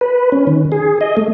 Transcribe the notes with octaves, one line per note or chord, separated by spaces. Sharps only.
B4
C#4
D#3
G#4
D#5
A3